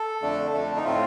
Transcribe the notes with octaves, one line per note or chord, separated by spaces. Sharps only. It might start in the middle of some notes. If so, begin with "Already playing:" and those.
Already playing: A4
F2 D3 A3 D4
F2 D3 A3 D4
D#4
A2 A3 C4 F4